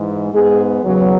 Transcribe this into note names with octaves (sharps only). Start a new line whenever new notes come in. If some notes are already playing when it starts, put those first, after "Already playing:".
Already playing: G#2 E3 G#3
G#2 G#3 B3 G#4
E2 C#3 F#3 B3